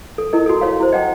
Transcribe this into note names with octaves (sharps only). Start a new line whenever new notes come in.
A4
E4 A#4 D#5
F#4 A4
C#5 F5
E4 F#4 C5
D#5 F#5 G5